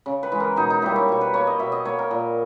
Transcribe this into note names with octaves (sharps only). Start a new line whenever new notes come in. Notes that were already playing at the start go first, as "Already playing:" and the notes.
C#3
B4
E3 G#3
A#4
B2 D#4
D#4
G3 A#3 E4
C#5
B2 C#5
B4
A#3 C#5
D#5
B2 E5
D#5
A#3 C#5
A#4
A#2